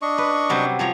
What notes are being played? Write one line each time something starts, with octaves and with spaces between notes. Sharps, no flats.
D4 D#5 C#6
B4
C3 F#3 G3
F3 C#5 A#5